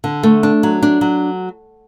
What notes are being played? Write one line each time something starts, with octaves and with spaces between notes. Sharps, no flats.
D3
A3
D4
F#3
D4
F#3